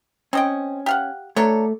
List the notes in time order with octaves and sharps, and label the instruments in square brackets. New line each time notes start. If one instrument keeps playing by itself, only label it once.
[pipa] C4 D#5 G5 [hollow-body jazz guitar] C#4
[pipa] G4 F5 F#5
[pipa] F#3 D4 C#5 [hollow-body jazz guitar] A3